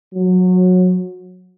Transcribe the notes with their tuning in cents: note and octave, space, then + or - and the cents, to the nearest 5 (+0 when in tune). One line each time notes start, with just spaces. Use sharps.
F#3 -20